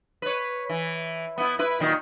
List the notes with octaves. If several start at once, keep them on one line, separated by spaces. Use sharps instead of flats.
B4 C#5
E3
B3 E4
E4 B4
A#2 D#3 F#3